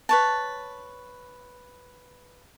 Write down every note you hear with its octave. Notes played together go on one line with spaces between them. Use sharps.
B4 C#5 A5